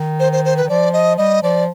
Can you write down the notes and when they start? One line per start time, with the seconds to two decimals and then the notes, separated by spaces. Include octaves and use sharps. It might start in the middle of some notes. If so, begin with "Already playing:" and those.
Already playing: D#3
0.20 C5
0.33 C5
0.45 C5
0.57 B4
0.64 D#3
0.69 F3 D5
0.93 D#5
1.18 G3 D#5
1.43 F3 D5